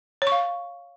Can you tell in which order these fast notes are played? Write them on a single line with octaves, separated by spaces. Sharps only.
C#5 C#6 F5